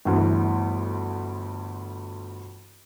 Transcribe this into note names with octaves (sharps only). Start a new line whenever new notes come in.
G1 D2 E3